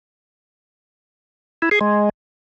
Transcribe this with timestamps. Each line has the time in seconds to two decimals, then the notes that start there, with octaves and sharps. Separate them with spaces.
1.62 E4
1.71 G#4
1.81 G#3